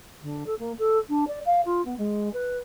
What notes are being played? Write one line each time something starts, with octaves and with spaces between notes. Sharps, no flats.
D3
A4
A#3
A4
D4
D5
F5
F4
B3
G#3
B4